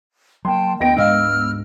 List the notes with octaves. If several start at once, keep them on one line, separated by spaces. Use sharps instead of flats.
F#3 A#3 G5 A5 C6
D2 B3 D#5 G5 A#6 D7
D2 G#2 G#3 D4 D#5 F5 E6 F6